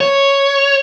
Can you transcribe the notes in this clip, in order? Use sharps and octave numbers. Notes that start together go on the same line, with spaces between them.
C#5